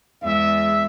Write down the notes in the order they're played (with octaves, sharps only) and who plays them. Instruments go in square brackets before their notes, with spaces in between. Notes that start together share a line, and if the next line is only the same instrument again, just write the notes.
[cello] E2 G#3 [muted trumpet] E5